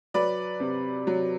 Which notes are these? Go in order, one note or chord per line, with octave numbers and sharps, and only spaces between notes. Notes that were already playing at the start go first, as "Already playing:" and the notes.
F#3 B4 D5
C3
F#3